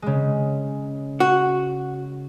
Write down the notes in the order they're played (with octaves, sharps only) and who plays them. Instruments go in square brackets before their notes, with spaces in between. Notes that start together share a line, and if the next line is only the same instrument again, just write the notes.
[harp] C#3 G#3
[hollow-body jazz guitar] F#4